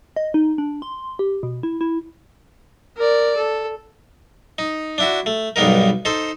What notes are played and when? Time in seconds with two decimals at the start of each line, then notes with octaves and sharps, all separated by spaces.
0.16 D#5
0.34 D#4
0.58 D4
0.82 C6
1.19 G4
1.43 B2
1.63 E4
1.81 E4
2.97 A#4 D5
3.37 A4
4.59 D#4
4.98 D4 E4 F#4
5.26 A3
5.56 B1 G2 B3 D#4 A#4
6.05 D#4 A4 C5